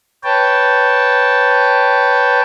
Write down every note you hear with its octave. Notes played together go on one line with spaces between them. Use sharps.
B4 C#5 G5 A5